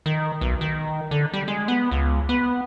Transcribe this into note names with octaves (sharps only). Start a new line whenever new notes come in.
D#3
B1
D#3
D3
G3
G#3
B3
C#2
B3